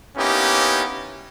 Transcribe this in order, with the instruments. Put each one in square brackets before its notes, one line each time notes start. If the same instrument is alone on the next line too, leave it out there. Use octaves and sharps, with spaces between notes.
[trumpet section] A#3 B3 C#4 D#4 E4 G4